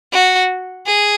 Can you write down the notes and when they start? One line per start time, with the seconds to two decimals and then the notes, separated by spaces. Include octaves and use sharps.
0.13 F#4
0.86 G#4